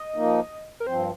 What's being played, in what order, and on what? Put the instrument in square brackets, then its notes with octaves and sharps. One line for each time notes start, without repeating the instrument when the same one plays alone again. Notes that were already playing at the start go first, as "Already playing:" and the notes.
Already playing: [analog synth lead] D#5
[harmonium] F3 A#3 D#4
[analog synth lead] A#4
[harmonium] G2 F3 C4 [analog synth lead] C5